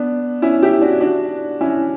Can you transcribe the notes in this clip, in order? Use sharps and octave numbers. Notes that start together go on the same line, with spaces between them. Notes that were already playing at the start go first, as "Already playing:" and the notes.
Already playing: B3 D4
C#4 E4
E4 G4
D4 F#4
D4 F#4
C#4 E4